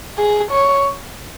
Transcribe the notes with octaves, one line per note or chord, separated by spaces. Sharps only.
G#4
C#5